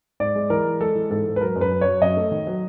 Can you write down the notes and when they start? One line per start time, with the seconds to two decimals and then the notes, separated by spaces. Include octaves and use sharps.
0.20 G#2 D5
0.35 G#3
0.50 E3 A#4
0.65 G#3
0.81 G#3 A4
0.95 E3
1.10 G#2 A4
1.26 G#2
1.36 B4
1.41 F#3 A#4
1.56 F#2
1.61 B4
1.71 F#2
1.81 F#3 C#5
2.01 F#2 D#5
2.17 A3
2.32 D#3
2.47 F#3